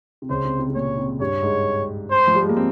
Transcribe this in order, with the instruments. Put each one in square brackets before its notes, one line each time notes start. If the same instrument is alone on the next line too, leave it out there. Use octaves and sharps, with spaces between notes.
[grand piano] C3
[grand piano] C#2 C#3 [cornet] C5
[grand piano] C3
C3
C3
[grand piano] A#2 [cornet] C#5
[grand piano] C3
[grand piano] G2 G3 [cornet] C#5
[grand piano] G#2 G#3
[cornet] C5
[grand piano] F3
G3
G#3
A#3
C4